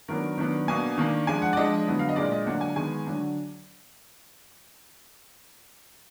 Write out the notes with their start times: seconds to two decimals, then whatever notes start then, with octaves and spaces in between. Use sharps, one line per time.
0.08 D#3 F#3 B3 D4 A#4
0.38 D#3 F#3 B3 D4
0.68 B2 A#3 D4 G#5
0.98 D#3 A#3 D4
1.27 F3 G#3 D4 G#5
1.42 F#5
1.53 D5
1.57 F3 G#3 D4 D#5
1.87 D3 F#3 B3
1.99 F5
2.09 D#5
2.16 A#2 G#3 D4 D5
2.32 D#5
2.46 D3 F#3 A#3 D4 F#5
2.61 G#5
2.76 D#3 G#3 B3 G#5
3.06 D3 F#3 D4